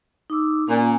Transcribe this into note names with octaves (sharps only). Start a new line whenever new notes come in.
D#4 D6 E6
A#2 C#4 G#5